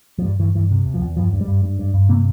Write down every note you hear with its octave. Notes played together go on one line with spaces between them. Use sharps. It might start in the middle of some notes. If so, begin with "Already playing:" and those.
F3
G2 G3
G2 E3
G2 E3
C3
E2
F3
E2
G2 F3
G2
G3
G2
G2
G2
G2
C3 A#3